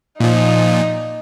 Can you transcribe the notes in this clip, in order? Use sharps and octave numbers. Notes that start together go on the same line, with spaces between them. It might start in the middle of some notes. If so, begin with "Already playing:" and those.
A#2 F3 D#4